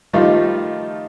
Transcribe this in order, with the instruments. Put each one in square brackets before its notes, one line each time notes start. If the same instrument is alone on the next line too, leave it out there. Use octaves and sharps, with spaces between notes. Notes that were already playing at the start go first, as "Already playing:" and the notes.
[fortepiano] D#3 F3 G3 A3 D#4 F4